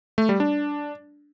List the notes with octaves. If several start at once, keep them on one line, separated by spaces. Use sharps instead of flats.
A3
G3
D4